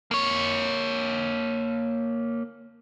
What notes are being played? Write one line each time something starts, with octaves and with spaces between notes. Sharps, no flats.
A#3 C#5